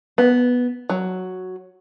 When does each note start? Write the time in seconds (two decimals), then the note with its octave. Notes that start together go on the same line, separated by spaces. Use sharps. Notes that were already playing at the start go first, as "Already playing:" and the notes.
0.18 B3
0.90 F#3